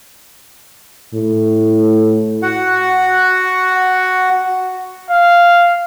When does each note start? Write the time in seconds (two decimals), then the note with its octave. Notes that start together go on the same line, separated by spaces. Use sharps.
1.14 A2
2.42 F#4 F#5
5.10 F5